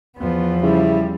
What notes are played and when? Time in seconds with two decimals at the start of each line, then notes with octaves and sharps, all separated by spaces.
0.18 E2 F3 B3
0.63 C#3 G3 E4